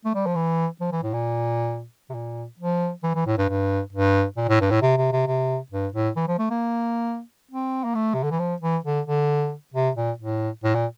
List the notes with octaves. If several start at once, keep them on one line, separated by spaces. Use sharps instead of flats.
A3
G3
F3
E3
F3
E3
A2
A#2
C3
A#2
F3
E3
E3
A2
G2
G2
G2
A#2
A2
G2
A2
C3
C3
C3
C3
G2
A2
E3
F3
A3
A#3
C4
A#3
A3
C3
D3
E3
F3
E3
D3
D3
C3
A#2
A2
A2
A#2